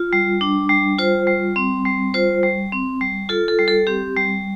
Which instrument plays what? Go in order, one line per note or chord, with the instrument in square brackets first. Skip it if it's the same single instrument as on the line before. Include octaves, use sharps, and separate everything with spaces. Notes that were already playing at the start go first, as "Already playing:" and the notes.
Already playing: [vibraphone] F4
G3
D4
G3
F4 C5
G3
C4
G3
F4 C5
G3
C4
G3
F4 A4
A4
G3
A4
C4 G4
G3